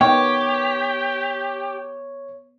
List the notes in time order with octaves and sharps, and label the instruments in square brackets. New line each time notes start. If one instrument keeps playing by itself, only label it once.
[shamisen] D#3 G5 [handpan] B3 [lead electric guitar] G4 [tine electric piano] C#5